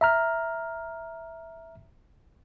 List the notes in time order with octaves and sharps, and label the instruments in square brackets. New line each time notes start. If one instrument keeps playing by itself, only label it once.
[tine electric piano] E5 A#5 F6